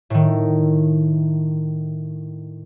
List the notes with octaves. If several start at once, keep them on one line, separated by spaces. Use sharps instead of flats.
A2 D#3